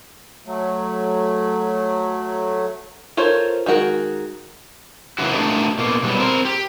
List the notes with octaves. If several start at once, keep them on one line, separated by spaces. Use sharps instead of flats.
F#3 A3
F4 A4 A#4 C5 C#5
D#3 G#3 F#4 A#4
C#3 E3 A#3 E4 F#4
A3 D4 F#4 G4 A#4 D#5
B2 A#3
B2 F#3 G3
C4 A#4
G4